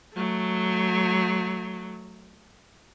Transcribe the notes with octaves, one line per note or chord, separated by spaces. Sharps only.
F#3 A3